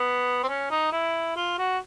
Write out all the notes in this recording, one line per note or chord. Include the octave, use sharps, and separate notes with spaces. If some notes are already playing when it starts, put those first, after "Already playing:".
Already playing: B3
C4
C#4
D#4
E4
F4
F#4